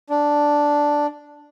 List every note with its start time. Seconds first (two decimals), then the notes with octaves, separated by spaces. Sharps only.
0.10 D4